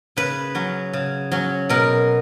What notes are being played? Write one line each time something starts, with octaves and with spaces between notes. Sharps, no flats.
C#3 B4
F#3 C#4
C#3
F#3 C#4
B2 A#4